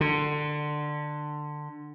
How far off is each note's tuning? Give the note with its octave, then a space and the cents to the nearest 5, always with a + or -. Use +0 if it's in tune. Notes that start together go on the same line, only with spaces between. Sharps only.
D3 +20